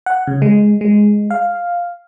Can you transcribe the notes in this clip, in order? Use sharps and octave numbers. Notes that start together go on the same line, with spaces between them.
F#5
C#3
G#3
G#3
F5